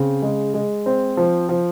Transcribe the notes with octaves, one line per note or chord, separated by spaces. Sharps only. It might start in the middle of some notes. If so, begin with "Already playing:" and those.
Already playing: C#3 C4
G#3
G#3
C4
F3
F3